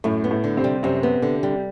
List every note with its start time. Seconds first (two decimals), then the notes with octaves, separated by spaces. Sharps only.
0.04 F#2 A2 A3
0.24 B3
0.31 A2 A3
0.44 D3
0.57 C3 C4
0.64 G3
0.83 F#2 C3 C4
1.03 B3
1.22 D3
1.43 G3